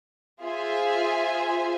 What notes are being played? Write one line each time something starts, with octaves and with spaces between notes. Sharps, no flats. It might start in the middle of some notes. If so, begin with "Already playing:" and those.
F4 G#4 C5 E5 G#5